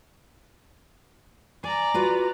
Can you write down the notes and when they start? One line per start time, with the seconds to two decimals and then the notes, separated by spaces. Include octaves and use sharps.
1.64 D5 G#5 A#5
1.94 F4 F#4 B4